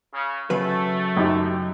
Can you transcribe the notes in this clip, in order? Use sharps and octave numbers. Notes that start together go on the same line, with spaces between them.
C#3
C#3 F#3 A3 B4
F#2 D#4 G4